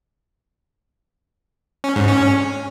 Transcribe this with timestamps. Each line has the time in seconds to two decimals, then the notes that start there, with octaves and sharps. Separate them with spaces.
1.84 C#4
1.96 G#2
2.08 C#4